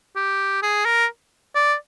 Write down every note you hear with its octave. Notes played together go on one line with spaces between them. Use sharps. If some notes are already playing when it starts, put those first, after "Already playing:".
G4
G#4
A#4
D5